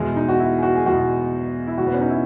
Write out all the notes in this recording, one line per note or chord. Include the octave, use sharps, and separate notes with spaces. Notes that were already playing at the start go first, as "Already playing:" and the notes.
Already playing: E2 B2 G#3
D#4
F#4
E4
G#4
F#4
G#4
E2 B2 G#3 F#4
E4
E2 B2 G#3 F#4
B3
C#4
D#4
E4